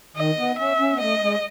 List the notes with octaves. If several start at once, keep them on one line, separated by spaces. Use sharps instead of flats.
D#3 D#5
B3
C#4 E5
C#4
B3
A3 D#5
G#3